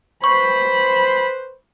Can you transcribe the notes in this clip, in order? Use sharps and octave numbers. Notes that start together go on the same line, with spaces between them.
B4 C5 B5 C#6